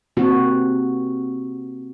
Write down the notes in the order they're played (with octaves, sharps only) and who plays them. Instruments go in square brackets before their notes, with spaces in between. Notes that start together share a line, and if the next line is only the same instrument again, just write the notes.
[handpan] C3 A#3 C4 F#4